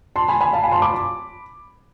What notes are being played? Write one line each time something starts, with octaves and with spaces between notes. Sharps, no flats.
A5 C6
G#5 B5
G#5 B5
F5 A5
G#5 B5
A5 C6
B5 D6